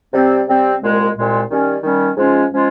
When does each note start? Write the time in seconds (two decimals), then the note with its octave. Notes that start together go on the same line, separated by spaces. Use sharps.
0.13 C3 G3 C4
0.47 C3 G3 C4
0.81 C2 A#2 G#3
1.15 C2 A#2 G#3
1.50 D#3 G3 C#4
1.82 D#3 G3 C#4
2.17 G#2 F3 G#3 C#4 F4
2.51 F3 G#3 C#4 F4